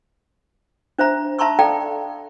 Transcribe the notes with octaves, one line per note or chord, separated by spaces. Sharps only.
D4 C5 E5 A#5
E5 A5 A#5 C6 C#6 E6
A4 D5 F5 G5 A#5